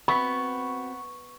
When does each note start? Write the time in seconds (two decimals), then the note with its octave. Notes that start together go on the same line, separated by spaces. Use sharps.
0.08 B3 C4 F#4 B5 C#6